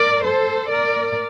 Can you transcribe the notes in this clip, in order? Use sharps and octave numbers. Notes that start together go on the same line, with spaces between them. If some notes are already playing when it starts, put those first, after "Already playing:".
Already playing: A#4 D5
A4 C5
A#4 D5